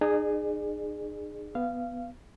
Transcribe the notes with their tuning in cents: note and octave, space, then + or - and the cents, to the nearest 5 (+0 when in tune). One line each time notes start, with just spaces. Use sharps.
D#4 -40 G#4 +0 D5 +35
B3 +0 F5 -15